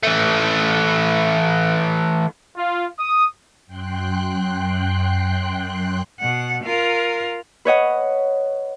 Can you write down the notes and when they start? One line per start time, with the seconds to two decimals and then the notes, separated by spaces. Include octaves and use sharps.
0.03 E3 A3
2.56 F4
2.98 D#6
3.67 F#2 G5 C6 F#6
6.20 B2 F#5
6.64 F4 A#4
7.65 B4 C#5 D#5 F#5